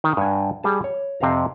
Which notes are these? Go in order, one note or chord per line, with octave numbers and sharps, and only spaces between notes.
D#3
G2 F#5 G#5
G3 G#4 A5
C#5
F2 C3 C5 F5 A#5